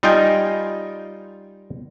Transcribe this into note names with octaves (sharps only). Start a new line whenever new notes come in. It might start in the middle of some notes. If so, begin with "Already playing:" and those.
G3 D#4 F4 D#5 G5 G#5